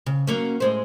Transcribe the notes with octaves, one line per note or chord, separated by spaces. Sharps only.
C#3
F#3 A#3 C#4
A2 G#3 C5